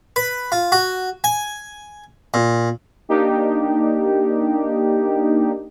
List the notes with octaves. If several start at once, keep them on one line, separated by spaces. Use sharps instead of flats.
B4
F4
F#4
G#5
A#2
A#3 D4 D#4 G4